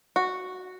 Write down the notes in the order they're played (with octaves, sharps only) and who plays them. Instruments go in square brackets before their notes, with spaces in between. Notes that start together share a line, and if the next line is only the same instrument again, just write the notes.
[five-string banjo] F#4